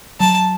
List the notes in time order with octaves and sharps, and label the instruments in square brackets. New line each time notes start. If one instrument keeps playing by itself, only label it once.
[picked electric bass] F#3 [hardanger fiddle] A5